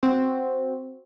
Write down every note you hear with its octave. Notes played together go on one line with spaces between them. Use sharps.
C4 F#4